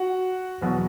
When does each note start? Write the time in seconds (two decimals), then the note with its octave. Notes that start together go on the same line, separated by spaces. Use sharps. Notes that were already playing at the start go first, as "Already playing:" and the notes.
Already playing: F#4 F#5
0.61 E2 B2 F#3